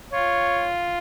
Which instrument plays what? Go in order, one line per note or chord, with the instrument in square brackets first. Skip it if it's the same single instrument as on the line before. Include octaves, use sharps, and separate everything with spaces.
[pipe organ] F4 [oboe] C#5